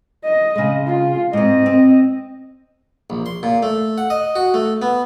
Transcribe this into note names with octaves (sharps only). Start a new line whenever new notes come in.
D#5
C#3 G#3
F4
G#2 C4 D#5
C4
A#1
C6
A#2
A3
F#5
D#5
F#4
A3
B3